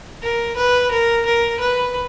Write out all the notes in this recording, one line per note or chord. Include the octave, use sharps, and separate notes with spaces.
A#4
B4
A#4
A#4
B4